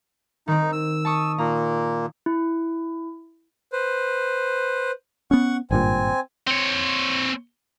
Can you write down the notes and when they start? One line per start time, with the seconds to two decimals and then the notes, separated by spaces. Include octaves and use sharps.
0.48 D#3 C4 D#4
0.72 E6
1.05 A5 C#6 D#6
1.38 A#2 A#3 A#5
2.26 E4
3.72 B4 C5
5.31 B3 C#4 F#5 C#6
5.71 G#1 G2 A#2 C4 G#5
6.47 C4 C#5